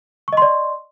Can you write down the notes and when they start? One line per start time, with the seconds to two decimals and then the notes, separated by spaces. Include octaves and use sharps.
0.28 C#6
0.33 D#5
0.37 C6
0.42 D5